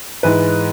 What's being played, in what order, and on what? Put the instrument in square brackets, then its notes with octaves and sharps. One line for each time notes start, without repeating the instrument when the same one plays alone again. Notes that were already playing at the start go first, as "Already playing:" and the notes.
[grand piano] G#2 E3 G#3 B4